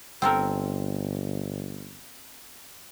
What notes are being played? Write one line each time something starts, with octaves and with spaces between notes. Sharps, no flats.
G1 C4 A4 A#4